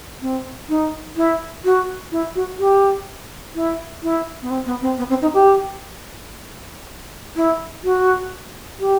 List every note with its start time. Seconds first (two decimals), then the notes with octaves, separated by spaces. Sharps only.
0.21 C4
0.69 D#4
1.16 E4
1.64 F#4
2.12 E4
2.35 F#4
2.59 G4
3.55 E4
4.03 E4
4.42 B3
4.50 C4
4.66 B3
4.82 C4
4.98 B3
5.10 C4
5.22 D#4
5.34 G4
7.36 E4
7.84 F#4
8.80 G4